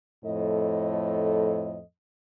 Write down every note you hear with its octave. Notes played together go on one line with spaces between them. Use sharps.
F2 A2 A4 D#5